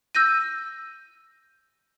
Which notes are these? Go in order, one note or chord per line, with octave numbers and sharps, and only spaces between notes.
E6 G6 A#6 D#7